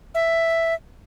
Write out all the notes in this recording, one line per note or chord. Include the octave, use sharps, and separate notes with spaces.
E5